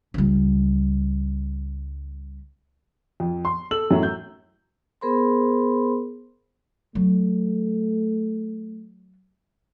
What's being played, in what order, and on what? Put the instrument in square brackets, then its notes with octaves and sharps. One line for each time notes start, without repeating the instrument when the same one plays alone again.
[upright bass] C#2 G3
[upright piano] F2
C6
A4 E6 F#7
F#2 A2 F#3 A3
G6
[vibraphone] B3 G#4 A#4 C5 B5 C6
[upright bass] F#3 [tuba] A3